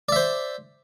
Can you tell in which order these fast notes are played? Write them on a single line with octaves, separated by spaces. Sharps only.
D5 E5 C5